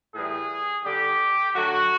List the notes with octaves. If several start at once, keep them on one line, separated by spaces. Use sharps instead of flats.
A2 E3 G3 G#4
D3 G3 G4
D3 F#3 A3 F#4